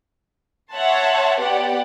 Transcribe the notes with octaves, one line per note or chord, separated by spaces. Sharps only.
C#5 E5 F#5 A5 C6
B3 G4 D5 F#5